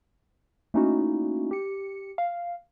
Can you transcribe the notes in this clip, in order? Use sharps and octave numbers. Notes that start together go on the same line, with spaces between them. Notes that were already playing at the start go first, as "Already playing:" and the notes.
A3 A#3 C#4 D#4 E4 F#4
G4 C#7
F5